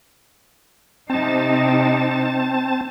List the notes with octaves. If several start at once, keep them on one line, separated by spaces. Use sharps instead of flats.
C3 C4 D#4 A5